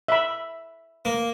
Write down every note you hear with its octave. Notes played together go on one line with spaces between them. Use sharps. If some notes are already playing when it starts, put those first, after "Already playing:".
E5 B5
A#3